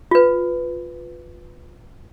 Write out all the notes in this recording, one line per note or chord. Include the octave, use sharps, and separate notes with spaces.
F4 B4